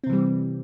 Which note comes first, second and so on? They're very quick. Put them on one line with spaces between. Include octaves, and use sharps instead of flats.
C4 C3 E3 G3